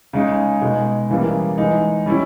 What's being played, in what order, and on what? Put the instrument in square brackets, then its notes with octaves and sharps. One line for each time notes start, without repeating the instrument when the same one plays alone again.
[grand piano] C#3 G#3 D#4
B2 G#3 D#4
C#3 E3 G3 A#3
E3 G#3 D#4
G3 C#4 E4